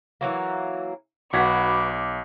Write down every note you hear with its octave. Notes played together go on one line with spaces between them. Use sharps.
E3 F#3 A#3
B1 F#4 G4 B4 D6 G#6 B6